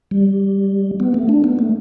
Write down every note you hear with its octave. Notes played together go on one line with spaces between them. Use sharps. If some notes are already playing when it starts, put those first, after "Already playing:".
G3
B3
A3
D4
B3
A3